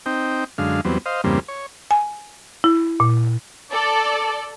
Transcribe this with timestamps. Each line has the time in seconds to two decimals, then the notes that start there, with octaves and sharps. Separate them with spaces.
0.06 C4 D#4 G5
0.58 F#2 D3 G#3 F5
0.85 E2 F#3 G3 B3 C4
1.06 C5 D#5 F5
1.24 E2 G2 C#3 G3 A#3 C4
1.48 C#5
1.91 G#5
2.64 E4
3.00 A#2
3.71 A4 D5